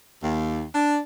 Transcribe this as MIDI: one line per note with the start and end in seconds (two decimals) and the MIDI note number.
0.22 0.62 39
0.74 0.97 62